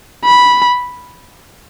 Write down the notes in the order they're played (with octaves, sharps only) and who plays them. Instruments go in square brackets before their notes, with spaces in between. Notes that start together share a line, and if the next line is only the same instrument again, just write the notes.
[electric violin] B5